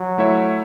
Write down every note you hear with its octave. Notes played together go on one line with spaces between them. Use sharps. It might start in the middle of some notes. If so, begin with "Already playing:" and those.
Already playing: F#3
A3 E4 C#5 E5